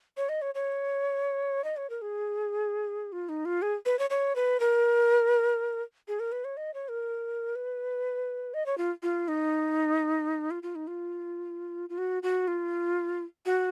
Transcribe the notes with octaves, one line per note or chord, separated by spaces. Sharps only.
C#5
D#5
C#5
C#5
D#5
C#5
A#4
G#4
F4
D#4
F4
G#4
B4
C#5
C#5
B4
A#4
G#4
A#4
B4
C#5
D#5
C#5
A#4
B4
D#5
C#5
F4
F4
D#4
F4
F4
D#4
F4
F4
F#4
F#4
F4
F#4